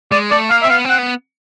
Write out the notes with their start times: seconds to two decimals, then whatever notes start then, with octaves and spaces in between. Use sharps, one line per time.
0.12 G#3 D5
0.31 A3 D5
0.50 A#3 F5
0.63 C4 E5
0.70 B3 F5
0.85 C4 F#5
0.99 B3